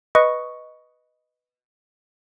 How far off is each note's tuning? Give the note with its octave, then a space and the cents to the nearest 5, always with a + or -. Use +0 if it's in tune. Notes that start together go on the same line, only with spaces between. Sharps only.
B4 +0 D#5 +0 C#6 +0